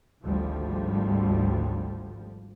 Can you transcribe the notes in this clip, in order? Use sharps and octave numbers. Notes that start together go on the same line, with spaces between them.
G#1 D2 F3 G3